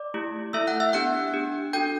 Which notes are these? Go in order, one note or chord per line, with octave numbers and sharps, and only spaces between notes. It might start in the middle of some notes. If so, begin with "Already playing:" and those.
Already playing: D5 D6
A3 E4 G4
A3 E4 A4 E5 E6
F#5 F#6
E5 E6
B3 D4 G4 F#5 F#6
D4 G4
D4 F#4 A4 G5 G6